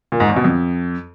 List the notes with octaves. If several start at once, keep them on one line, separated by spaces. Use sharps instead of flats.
A#2
G#2
E2
B2
F2